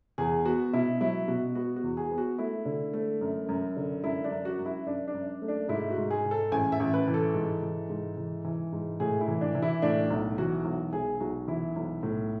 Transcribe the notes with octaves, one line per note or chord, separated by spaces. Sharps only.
E2 G#4
B3 F#4
B2 E4
F#3 E4
B2 F#4
B3 F#4
F#4
E2
G#4
B3
F#4
A3 E4
D3
A3
F#2
F#2
D3
F#2 E4
D4
F#2
F#4
F#2
E4
F#2 D4
D4
F#2
A3
D4
G#2 E4
F#4
G#2
G#4
G#2
A4
A1 G#5
E5
A1
B4
E3
A4
G#2
E3
G#2
E3
E3
G#2
A2 G#4
E4
E3
D4
E3
E4
A2 D4
B1
E3 F#4
B1
B1 G#4
B1 F#4
E3 E4
B1
A2